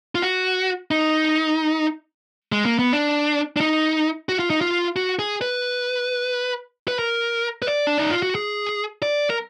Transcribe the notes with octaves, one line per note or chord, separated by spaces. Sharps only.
F4
F#4
D#4
G#3
A#3
B3
D4
D4
D#4
F#4
F4
D#4
F4
F#4
G#4
B4
B4
A#4
B4
D5
D4
D#4
F4
F#4
G#4
D5
A#4